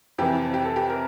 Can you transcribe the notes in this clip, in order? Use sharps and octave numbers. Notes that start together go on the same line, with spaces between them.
F2 C3 E3 G4
G4
A4
G4
A#4